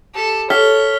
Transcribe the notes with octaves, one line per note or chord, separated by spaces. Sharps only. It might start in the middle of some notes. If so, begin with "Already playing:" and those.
G4 A4
A4 C#5 F6 B6 G7